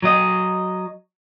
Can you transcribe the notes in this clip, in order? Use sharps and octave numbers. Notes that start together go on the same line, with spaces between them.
F#3 D#5